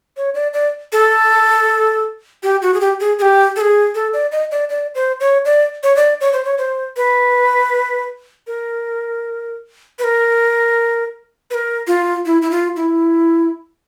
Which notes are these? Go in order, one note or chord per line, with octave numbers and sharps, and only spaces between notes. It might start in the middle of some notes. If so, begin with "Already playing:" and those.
C#5
D5
D5
A4
G4
F#4
G#4
G4
G#4
G#4
G4
A4
G#4
A4
D5
D#5
D5
D5
C5
C#5
D5
C#5
D5
C#5
C5
C#5
C5
B4
A#4
B4
A#4
B4
A#4
F4
E4
E4
F4
E4